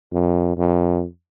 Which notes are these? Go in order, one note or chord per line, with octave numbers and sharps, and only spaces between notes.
F2
F2